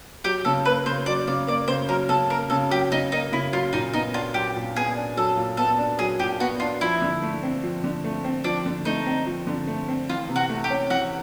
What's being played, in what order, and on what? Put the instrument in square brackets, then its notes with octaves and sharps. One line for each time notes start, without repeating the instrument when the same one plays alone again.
[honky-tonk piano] F#3 [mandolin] G4
[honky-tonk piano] C#3 [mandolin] A4
[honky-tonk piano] A#3 [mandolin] B4
[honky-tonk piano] C#3 [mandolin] C5
[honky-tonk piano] F#3 [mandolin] D5
[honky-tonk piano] C#3 [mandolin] D5
[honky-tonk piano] A#3 [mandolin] D5
[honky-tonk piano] C#3 [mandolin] C5
[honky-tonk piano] F#3 [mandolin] A#4
[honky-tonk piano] C#3 [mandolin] A4
[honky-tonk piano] A#3 [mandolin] A#4
[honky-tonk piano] C#3 [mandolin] A4
[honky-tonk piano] F#3 [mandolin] G4
[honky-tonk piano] C#3 [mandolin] D#4
[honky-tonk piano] A#3 [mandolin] D#4
[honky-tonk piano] C#3 [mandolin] E4
[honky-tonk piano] F#3 [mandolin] F4
[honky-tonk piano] A#2 [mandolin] D#4
[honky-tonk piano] B3 [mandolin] D#4
[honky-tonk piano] D4 [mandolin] F4
[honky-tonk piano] F#3 [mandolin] G4
[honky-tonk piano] A#2
[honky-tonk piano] B3 [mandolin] G#4
[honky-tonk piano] D4
[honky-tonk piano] F#3 [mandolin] A4
[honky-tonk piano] A#2
[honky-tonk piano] B3 [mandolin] A4
[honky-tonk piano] D4
[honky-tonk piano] F#3 [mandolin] G#4
[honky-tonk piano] A#2 [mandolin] G4
[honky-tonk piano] B3 [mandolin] F#4
[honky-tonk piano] D4 [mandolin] F4
[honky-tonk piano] F3 [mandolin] E4
[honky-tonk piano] D3
A3
C4
F3
D3
A3
C4
[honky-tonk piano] F3 [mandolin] D4
[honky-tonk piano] D3
[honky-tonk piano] A3 [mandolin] D#4
[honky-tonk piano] C4
F3
D3
A3
C4
[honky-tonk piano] E3 [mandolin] F4
[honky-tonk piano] C3
[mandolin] F#4
[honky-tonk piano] A3
[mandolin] G4
[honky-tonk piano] C#4
[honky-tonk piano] E3 [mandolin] F#4